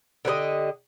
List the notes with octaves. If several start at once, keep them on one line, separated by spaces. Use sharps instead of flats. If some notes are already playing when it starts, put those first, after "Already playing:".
D3 G4 B4 D#5